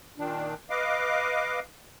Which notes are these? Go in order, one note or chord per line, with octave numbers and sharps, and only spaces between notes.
A#2 D#3 D4
B4 D#5 F5 D6